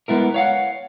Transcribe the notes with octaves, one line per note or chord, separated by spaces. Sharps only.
G#3 B3 E4 A#4
C#5 F5 F#5